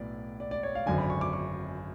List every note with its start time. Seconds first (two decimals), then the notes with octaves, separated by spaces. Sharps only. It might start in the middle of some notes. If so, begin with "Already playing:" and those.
Already playing: B1 A2 B3 D5
0.40 D5
0.51 D5
0.63 C#5
0.75 F5
0.86 G#1 F#2 D3 G#5
0.98 B5
1.10 C#6
1.21 D6
1.33 C#6